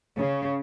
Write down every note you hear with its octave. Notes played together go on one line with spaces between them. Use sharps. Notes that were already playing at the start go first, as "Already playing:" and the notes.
C#3